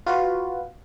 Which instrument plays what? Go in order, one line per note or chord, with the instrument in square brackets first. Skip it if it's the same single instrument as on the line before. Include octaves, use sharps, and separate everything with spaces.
[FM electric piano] F4 F#4 B4